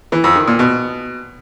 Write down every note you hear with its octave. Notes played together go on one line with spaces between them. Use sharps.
E3
F2
D#3
A#2
B2